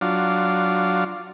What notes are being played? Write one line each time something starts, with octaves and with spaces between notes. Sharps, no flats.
F#3 D4 F4